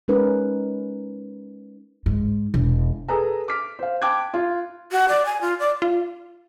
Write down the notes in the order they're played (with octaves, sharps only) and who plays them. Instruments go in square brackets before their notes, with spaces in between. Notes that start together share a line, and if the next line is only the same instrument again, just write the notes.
[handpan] G#3 C#4 D#4 A#4 B4
[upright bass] G#2
E1
[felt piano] G#4 A4 B4 A#5
D6 F6 B6
C5 F5
G5 A5 B5 D6 F#6 G#6
F4
[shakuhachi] F#4
D5
G#5
F4
D5
[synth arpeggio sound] F4